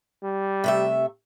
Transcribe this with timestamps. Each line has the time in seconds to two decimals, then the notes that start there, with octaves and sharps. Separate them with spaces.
0.23 G3
0.64 C3 A3 E5